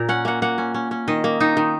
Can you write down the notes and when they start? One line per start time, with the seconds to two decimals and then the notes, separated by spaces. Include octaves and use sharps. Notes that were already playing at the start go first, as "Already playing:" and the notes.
Already playing: A#2 A#4
0.09 C#4 F#5
0.25 A#3 F#5
0.42 A#3 F#5
0.58 C#4
0.74 C#4
0.91 C#4
1.08 D#3 D#5
1.24 A#3
1.40 D#3 D#4
1.57 D#3